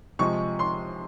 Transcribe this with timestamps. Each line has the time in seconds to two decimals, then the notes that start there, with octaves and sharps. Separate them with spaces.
0.19 C3 F3 G#3 C#6
0.59 C6